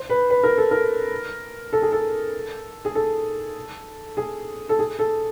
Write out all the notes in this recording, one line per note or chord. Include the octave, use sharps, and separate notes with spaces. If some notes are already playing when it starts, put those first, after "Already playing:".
Already playing: C5
B4
B4
A#4
A4
A#4
A4
G#4
A4
G#4
A4
G#4
A4
G#4
A4